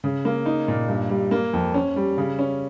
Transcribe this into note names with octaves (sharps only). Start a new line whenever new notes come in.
C#3
A#3
D#4
A#2
G2
G3
A#3
F2
C#4
G3
C#3
C#4